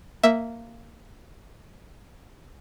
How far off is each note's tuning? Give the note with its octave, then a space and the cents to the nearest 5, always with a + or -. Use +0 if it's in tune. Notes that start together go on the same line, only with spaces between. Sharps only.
A#3 -10 E5 +0